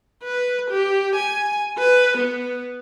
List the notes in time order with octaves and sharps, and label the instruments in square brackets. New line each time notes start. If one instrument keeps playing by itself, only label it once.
[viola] B4
G4
G#5
B4
B3